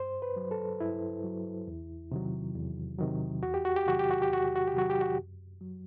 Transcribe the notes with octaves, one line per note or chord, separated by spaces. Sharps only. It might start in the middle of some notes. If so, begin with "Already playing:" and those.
Already playing: G2 C5
B4
F#3
A4
G2 E4
F#3
E2
C3 D#3 F#3
E2
C3 D#3 F#3
E2 F#4
G4
F#4
G4
C3 D#3 F#3 F#4
G4
F#4
G4
E2 F#4
G4
F#4
G4
C3 D#3 F#3 F#4
G4
F#4
F#2
F#3